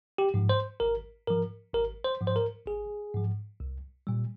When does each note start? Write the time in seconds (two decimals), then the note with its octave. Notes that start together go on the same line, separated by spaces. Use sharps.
0.18 G4
0.34 G#2 F3
0.49 C5
0.80 G#1 A#4
1.27 G#2 F3 A#4
1.74 G#1 A#4
2.04 C5
2.21 G#2 F3
2.27 C5
2.36 A#4
2.67 G#1 G#4
3.14 G#2 F3
3.60 C2
4.07 A#2 G3